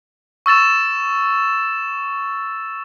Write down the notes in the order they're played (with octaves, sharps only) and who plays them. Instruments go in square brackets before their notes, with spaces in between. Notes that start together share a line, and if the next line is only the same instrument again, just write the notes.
[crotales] C#6 E6 A6 E7